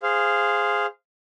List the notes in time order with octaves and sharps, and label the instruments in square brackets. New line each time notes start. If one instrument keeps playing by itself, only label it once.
[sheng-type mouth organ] G#4 C5 F5